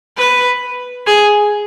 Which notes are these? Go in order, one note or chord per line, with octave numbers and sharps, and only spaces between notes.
B4
G#4